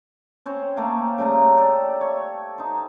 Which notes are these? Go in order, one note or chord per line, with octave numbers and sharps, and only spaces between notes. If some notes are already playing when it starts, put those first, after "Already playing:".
C4 C#4 C5
A3 A#3 F5
C#3 G3 A3 A#5
G4 A4 D5
C#5
D#4 C5